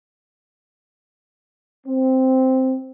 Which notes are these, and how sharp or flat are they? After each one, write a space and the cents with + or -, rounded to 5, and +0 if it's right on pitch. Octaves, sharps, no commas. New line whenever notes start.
C4 -5